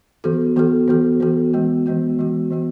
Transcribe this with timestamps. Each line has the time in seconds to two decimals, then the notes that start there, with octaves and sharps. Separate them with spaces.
0.24 E3 B3 F#4 A4
0.56 E3 B3 F#4 A4
0.88 E3 B3 F#4 A4
1.20 E3 B3 F#4 A4
1.53 E3 G#3 B3 F#4
1.86 E3 G#3 B3 F#4
2.18 E3 G#3 B3 F#4
2.51 E3 G#3 B3 F#4